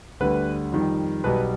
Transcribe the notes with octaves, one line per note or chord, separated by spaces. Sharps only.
D2 D3 G3 B4
F2 D#3 G3
B1 B2 G3 B4